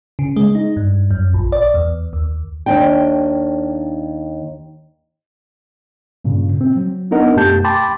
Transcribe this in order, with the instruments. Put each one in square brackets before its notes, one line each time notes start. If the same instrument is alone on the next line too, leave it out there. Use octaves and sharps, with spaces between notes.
[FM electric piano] C#3
G#3
D#4
G2
F#2
A#1
D5
E2
D#2
[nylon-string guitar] D#2 D#3 D4 G5
[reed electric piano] G2 A#2 C#3
C4
F#3
B3 D4 D#4 A#4 D#5 F#5
F#2 B2 A3 G4 A5 G6
G5 A5 B5 C6 D6 A6